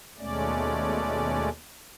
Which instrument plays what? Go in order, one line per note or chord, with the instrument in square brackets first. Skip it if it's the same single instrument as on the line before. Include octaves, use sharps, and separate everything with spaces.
[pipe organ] D#2 B2 G#3 A3 C#4 D5